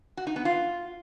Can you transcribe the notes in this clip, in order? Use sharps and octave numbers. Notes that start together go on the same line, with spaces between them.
F#4
D#4
B3
F4